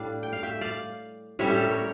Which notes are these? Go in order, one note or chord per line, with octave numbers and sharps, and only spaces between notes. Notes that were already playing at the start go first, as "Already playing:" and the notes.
Already playing: A2 G3 D4 D5 F5
G5
F5
E5 G5
D5 F5
A2 G3 C#4 C#5 E5
G4
A4
A#4
C#5
A#4